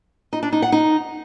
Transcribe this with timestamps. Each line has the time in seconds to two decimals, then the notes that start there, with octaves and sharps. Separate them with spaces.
0.33 D#4
0.43 D4
0.52 D#4
0.62 F#5
0.72 D#4